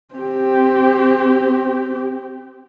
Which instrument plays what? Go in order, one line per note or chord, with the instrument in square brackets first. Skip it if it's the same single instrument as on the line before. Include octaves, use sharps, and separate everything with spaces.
[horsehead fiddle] C4 G4